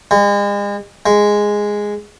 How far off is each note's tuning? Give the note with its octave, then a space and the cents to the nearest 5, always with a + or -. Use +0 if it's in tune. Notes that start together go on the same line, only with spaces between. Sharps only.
G#3 -40
G#3 -5